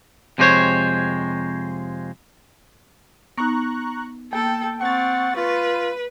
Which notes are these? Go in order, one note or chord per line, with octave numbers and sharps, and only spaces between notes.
F2 C3 G#3 B3 C5 C#5
B3 D#4 A#5 C#6 F#6
A#3 A4 G5
C4 F#5 C#6 A6
F4 B4